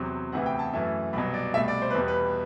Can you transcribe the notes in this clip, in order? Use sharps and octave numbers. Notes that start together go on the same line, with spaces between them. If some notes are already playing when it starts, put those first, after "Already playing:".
Already playing: E2 C3 F#3 C4
D2 C3 E3 B3 E4 F#5
G5
A5
F#2 E3 A3 E4
C2 B2 F#3 B5
D5
C2 B2 A3 E5
D5
C5
B4
E2 B2 G3
B4